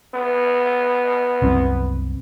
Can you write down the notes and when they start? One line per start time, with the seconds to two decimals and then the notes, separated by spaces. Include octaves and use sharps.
0.15 B3
1.42 F#1 C2 C4